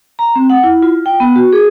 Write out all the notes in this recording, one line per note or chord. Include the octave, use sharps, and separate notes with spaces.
A#5
C4
F#5
E4
F4
G5
B3
F#4
G#4